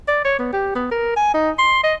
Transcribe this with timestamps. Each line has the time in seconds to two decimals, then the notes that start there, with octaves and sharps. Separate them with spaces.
0.08 D5
0.25 C#5
0.39 B3
0.53 G4
0.75 B3
0.91 A#4
1.16 G#5
1.34 D#4
1.59 C6
1.83 D#5